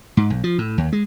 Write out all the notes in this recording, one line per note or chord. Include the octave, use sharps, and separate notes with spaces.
G#2
B1
F3
A2
D#2
G#3